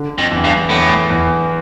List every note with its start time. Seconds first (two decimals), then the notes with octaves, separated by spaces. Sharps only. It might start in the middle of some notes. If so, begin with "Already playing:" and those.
Already playing: D3
0.19 F2
0.32 E2
0.45 G2
0.70 E2 A2
1.10 E2